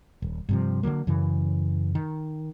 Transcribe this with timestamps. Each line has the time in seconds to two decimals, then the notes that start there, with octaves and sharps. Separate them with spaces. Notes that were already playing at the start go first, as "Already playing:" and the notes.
0.22 D#1
0.49 G2 C3 F3
0.83 D3 E3 F#3 A#3
1.07 F#2 C#3 E3
1.95 D#3